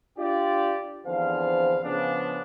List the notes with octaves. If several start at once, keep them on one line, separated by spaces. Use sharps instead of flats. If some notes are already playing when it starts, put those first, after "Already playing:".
D4 F4 G4 D5
E2 D3 F3 C4 F5
C#3 F3 B3 D4